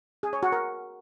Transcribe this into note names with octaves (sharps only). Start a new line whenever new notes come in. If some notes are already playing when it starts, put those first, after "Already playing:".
G#4
C#5
F#4
A#4